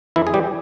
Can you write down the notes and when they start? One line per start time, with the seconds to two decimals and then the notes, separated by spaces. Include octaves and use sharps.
0.16 F2 E3 E4
0.27 G#4
0.34 E3 G3 G4